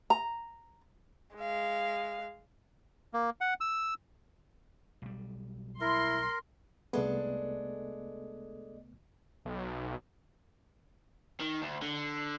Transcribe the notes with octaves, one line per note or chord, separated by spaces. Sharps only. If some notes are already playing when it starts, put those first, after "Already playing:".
A#5
G#3 F5
A#3
F#5
E6
B1 G3
E4 A#4 C6
C2 G#3 A3 B3 D4 A4
B1
D#3
D2
D3